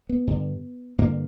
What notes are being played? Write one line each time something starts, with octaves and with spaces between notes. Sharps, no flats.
B3
G2 D3
G2 D3 A#3